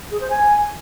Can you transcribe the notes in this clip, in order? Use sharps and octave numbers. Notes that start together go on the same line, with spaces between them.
G#4
C5
G#5